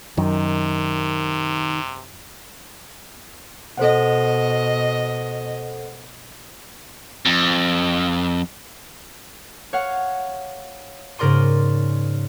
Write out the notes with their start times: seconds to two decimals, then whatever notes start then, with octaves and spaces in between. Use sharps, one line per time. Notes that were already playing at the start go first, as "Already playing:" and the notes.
0.17 F#2 C3 D#3
3.77 B2 A4 C5 D#5 F#5
7.26 F2
9.73 C#5 F5 F#5
11.18 G#2 C#3 A#4 D5 C6 D#7